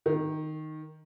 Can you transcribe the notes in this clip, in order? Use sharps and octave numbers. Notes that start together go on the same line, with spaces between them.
D#3